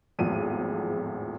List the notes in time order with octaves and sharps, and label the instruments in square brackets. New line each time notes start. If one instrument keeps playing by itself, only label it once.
[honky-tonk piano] G#1 E2 A2 F3 G#3 D#7